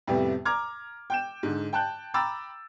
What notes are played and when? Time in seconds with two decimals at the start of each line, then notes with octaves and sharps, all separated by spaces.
0.07 F2 A2 C3 G3 B3
0.45 A#5 D6 F6 G#6
1.10 G5 G6 E7
1.43 G#2 D3
1.73 G5 A5 F#6 G6
2.14 G5 A#5 B5 D6 E6 A6